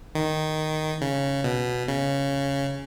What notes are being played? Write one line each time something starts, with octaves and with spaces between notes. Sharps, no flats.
D#3
C#3
B2
C#3